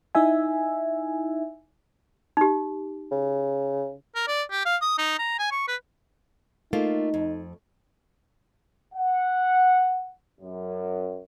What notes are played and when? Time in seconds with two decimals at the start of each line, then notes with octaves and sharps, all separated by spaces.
0.15 D#4 E4 E5 G#5
2.37 D#4 G4
3.11 C#3
4.15 A#4
4.28 D5
4.50 G4
4.66 F5
4.82 D#6
4.98 D#4
5.19 A#5
5.39 G#5
5.51 C#6
5.68 B4
6.73 A3 A#3 D#4 F4
7.14 F2
8.94 F#5
10.39 F#2